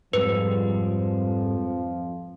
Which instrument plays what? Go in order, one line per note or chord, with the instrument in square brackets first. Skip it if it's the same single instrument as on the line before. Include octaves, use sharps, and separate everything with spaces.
[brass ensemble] F2 F3 [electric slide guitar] G#2 G3 G#3 [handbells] B4